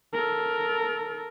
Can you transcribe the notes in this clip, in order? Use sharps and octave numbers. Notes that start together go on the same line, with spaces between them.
A4 A#4